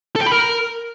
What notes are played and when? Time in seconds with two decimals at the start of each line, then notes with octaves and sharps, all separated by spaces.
0.16 A4
0.21 G5
0.26 B5
0.32 A#4